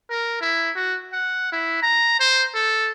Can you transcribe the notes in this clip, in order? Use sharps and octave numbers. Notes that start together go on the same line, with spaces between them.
A#4
E4
F#4
F#5
E4
A#5
C5
A4